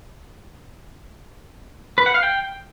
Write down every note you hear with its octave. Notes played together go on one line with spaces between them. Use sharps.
B4
F#5
F5
G5